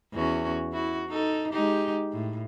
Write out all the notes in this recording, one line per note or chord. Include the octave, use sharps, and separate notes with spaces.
E2 C#4 F#4
E4 F#4
D#4 A4
G#3 D#4 G4
A2